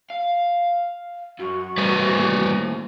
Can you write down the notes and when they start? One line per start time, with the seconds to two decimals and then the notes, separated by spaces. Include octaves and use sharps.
0.10 F5
1.39 F#2 F#4
1.78 G3 A3 C4 B4 C5
2.05 D#2 A2